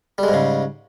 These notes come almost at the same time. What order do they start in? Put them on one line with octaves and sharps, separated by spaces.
G3 G#3 G#2 C#3